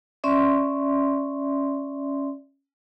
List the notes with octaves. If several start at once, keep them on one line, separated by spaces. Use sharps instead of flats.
C#4 D5 E5 C6